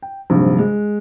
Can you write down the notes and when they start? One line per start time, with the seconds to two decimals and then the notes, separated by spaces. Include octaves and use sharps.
0.02 G5
0.30 A#1 G2 C3 D#3 F#3 G3
0.59 G#3